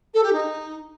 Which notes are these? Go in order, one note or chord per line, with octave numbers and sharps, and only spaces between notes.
A4
G4
D#4